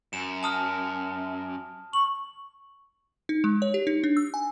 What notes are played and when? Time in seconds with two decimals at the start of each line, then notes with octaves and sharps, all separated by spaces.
0.13 F#2 E7
0.43 A5 D#6 F6
1.93 C#6 F#7
3.29 D#4
3.44 G#3
3.62 C#5
3.74 G4
3.87 D#4
4.04 D4
4.17 E6
4.34 G#5